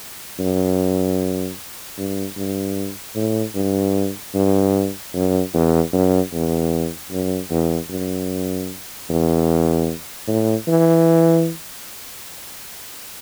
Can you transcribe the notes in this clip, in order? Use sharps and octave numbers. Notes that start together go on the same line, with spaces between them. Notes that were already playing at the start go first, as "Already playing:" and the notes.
F#2
G2
G2
A2
G2
G2
F#2
E2
F#2
E2
F#2
E2
F#2
E2
A2
E3